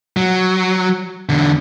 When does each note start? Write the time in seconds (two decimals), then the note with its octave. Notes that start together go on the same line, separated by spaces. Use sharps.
0.17 F#3
1.29 E2 D3